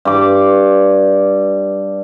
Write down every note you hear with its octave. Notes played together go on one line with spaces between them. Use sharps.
G2 D6